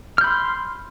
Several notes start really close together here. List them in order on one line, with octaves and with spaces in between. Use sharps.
F6 G6 B5 C6